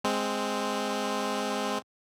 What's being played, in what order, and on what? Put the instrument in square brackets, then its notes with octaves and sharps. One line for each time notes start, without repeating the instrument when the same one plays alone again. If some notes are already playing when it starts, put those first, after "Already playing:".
[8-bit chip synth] G#3 C4